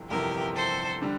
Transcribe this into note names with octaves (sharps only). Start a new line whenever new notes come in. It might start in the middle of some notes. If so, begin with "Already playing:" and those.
Already playing: G1 F2 C3 E3
G1 F2 C3 E3 G4 A#4
A4 C5
D3 G3 D4